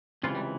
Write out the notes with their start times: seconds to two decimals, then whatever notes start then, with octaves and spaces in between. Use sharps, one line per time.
0.23 C#2 C3 E3 F4
0.35 G3